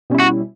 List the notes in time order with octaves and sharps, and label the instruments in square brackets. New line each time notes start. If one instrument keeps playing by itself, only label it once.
[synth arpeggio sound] B2 G3 C#4 E4
[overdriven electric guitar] F#4